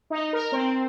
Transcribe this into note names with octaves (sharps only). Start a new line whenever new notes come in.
D#4
A#4
C4